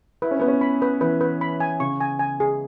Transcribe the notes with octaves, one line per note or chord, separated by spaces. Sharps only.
E4 B4
C#4
B3 B4
C#4
B5
B4
E3 B4
B4
B5
G#5
C#3 C#6
G#5
G#5
G#4